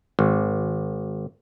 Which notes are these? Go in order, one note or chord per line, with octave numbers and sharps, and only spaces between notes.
G#1